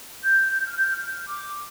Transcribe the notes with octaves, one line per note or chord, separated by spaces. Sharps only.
G6
G6
F6
G6
F6
D6